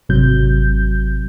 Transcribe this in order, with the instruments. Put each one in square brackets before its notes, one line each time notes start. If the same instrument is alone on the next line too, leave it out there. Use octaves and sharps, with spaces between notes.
[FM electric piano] G#1 C3 F#3 G6